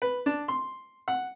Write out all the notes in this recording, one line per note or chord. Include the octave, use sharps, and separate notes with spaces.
B4
D4
C6
F#5